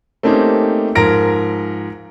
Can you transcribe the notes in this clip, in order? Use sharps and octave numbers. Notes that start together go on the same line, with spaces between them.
A3 A#3 C4 C#4 D#4 G4
G#2 F3 A#4 A#6 D7